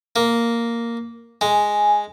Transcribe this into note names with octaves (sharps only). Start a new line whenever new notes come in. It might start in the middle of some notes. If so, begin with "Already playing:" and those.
A#3
G#3 G#5